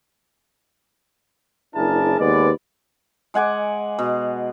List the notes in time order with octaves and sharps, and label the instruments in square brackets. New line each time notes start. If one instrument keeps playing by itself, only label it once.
[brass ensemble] F#1 D4 E4 G#4 A#4 A5
D#2 G#3 B3 B4 D5
[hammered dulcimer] G#3 F#5 G#5 D6
B2